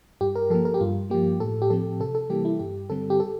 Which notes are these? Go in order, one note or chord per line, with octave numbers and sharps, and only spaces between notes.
G2 G4
A#4
F3 A#3 A4
A#4
G4
G2 F4
F3 A#3 G4
A2 A4
G4
F3 C4 A4
C3 A4
A4
E3 G3 A#3 G4
E4
G2 G4
D3 G3 C4 A4
G4
A4